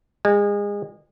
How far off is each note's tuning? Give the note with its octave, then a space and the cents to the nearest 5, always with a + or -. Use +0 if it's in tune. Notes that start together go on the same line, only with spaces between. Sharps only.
G#3 -30